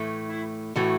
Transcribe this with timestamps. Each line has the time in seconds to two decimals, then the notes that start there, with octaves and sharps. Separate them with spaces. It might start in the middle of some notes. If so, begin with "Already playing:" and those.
Already playing: A2 E3 A3
0.29 E4
0.76 A2 E3 A3 F#4